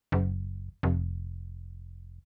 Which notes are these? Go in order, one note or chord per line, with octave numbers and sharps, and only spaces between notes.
F#1
F1